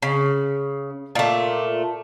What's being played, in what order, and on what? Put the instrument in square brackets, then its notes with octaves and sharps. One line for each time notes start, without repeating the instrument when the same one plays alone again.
[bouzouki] C#3
A#2 A3